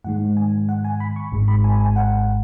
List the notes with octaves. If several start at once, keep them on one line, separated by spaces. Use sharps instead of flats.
G#2 D#3 G#3 F#5
G#5
F#5
G#5
B5
C#6
G#1 G#2 G#3
B5
G#5
G#5
F#5